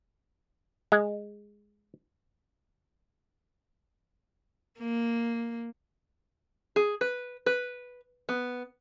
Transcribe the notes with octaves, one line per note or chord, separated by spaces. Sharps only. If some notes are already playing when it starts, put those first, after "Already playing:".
G#3
A#3
G#4
B4
B4
B3